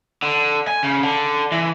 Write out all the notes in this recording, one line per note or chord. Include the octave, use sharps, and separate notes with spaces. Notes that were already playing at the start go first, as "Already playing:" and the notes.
D3
G#5
C#3
D3
E3